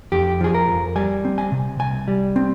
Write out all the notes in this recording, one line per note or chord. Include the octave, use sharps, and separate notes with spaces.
F2 G4
F3 G#4
A#4
F2
G3 G#5
C4
G#5
C3
C2 G#5
G3
C4